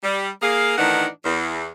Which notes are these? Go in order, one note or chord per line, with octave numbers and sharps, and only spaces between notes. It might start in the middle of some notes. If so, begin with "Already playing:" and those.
G3
A#3 G#4 F5
A2 D#3 E3 D4 D#4 F#5
E2